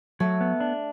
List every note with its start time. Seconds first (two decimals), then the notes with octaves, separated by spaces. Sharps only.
0.20 F#3 A3
0.41 B3
0.60 D4